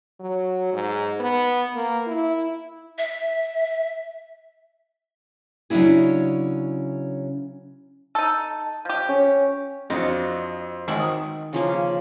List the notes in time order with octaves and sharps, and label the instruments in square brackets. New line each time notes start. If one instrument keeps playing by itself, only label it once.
[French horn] F#3
G#2
B3
A#3
E4
[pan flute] E5
[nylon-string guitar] C#3 F#3 C#4 D4 E4 G#4
[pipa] D#4 A4
F3 G4
[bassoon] C#4
[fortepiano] F2 D#5 [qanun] D4 F4 F#4
[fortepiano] G#1 [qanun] D#3 E5 F#5
[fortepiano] D#6
[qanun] C#3 F3 A#3